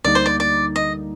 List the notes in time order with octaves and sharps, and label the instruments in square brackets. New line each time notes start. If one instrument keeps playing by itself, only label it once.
[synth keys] D2 D3 G3 A#3 D#4 [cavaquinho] D5
[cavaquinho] C5
D5
D5
D#5